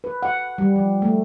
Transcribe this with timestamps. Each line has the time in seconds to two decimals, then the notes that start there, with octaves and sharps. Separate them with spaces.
0.04 B4
0.23 F#5
0.58 G3
0.76 F3
1.02 A3